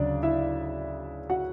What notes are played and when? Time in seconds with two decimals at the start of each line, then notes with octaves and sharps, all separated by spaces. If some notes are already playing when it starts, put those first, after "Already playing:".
Already playing: D2 C#3 F#3 D4 D5
0.23 E4 E5
1.30 F#4 F#5